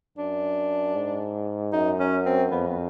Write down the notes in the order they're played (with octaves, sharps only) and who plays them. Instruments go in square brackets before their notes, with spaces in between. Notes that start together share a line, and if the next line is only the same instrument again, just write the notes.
[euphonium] F#2 [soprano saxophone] D4
[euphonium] G#2
[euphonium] F#2 [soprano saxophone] D#4
[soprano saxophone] C#4
C4
[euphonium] F2 [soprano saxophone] B3
[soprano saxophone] B3